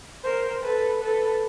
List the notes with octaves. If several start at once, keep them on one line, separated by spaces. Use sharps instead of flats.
A#4 C5
A4 B4
A4 B4